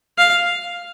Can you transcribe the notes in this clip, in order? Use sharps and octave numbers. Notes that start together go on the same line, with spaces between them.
F5